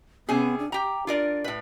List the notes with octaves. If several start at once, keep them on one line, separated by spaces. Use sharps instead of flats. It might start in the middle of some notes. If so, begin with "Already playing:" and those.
C3 B3 C#4 G#4
D4
G4 G5 A#5
D4 F4 A#4 D5
A2 B4